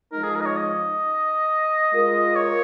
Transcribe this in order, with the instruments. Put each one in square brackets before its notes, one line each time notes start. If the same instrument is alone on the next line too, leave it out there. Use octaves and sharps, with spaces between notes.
[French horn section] F3 G#3 D#4 [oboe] A#4
[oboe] G#4
A#4
D#5
C#5
D#5
[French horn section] G#3 F4 A#4
[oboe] C#5